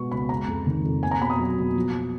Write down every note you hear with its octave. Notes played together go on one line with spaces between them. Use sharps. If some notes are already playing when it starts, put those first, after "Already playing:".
Already playing: B2 G#3 B3 C#6
C#2 B5
G#3 A#5
F2
D#3
F2
A#3 G#5
A#5
B2 B5
D#6
F#3
B2
F3